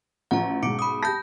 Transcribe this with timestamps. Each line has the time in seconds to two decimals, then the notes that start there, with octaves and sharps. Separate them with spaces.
0.31 A1 F3 F#5 A#5
0.63 B1 G#2 D6 C#7 D7
0.79 B5 D#6
1.03 G4 A5 G6 A#6